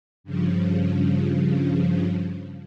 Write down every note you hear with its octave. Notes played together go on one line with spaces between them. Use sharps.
G2 C#3 F3